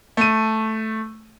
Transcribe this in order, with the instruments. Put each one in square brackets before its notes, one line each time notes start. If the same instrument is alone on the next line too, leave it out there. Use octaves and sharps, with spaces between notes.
[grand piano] A3 D#7